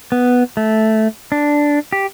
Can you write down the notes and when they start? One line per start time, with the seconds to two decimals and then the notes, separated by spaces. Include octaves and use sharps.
0.12 B3
0.57 A3
1.32 D4
1.92 G4